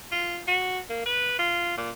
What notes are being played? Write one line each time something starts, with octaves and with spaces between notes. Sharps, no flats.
F4
F#4
A#3
B4
F4
A#2